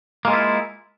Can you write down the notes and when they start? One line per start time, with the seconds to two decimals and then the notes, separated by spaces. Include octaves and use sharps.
0.25 A#3
0.28 G#3
0.30 F4
0.33 E4